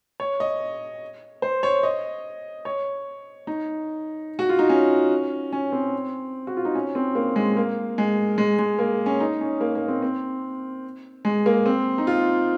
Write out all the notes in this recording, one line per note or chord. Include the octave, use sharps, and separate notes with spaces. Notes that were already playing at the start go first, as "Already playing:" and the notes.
C#5
D#5
C5
C#5
D#5
C#5
D#4
F#4
F4
D#4
C#4
C#4
C4
F#4
F4
D#4
C#4
C4
A#3
G#3
A#3
G#3
G#3
G#3
A#3
C#4
D#4
C#4
A#3
A#3
C4
C4
G#3
A#3
C4
D#4
F4